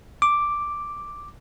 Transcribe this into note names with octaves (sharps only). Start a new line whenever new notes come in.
D6